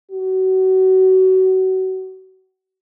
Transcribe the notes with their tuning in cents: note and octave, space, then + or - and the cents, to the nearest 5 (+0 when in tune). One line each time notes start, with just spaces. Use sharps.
F#4 +30